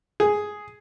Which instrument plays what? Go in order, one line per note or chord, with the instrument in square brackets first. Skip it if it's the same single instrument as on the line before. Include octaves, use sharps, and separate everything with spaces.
[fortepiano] G#4